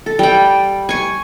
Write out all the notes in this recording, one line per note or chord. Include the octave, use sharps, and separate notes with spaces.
A4
G3 G5
G#5 C#6